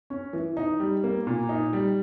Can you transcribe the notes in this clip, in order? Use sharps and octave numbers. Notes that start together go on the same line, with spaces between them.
C#4
E3
D#4
G3
A#3
A#2
D#4
G3